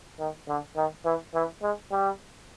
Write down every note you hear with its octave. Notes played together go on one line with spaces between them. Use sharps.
D#3
D3
D#3
E3
E3
G#3
G3